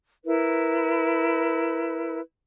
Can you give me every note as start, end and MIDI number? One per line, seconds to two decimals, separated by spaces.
0.24 2.20 64
0.24 2.20 70
0.24 2.20 71